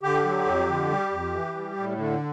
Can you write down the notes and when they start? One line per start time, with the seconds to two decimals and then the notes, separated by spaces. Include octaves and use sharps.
0.03 D3 G4
0.25 F#3
0.46 F2
0.69 D3
0.90 G3
1.12 F2
1.34 E3
1.55 G3
1.77 A2
1.98 D3